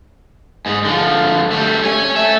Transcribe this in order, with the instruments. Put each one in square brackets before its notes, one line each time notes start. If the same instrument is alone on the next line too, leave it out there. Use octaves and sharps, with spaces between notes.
[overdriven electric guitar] G#2 G#3
D3 F3
G3 A3
C#5 G#5
A3 E5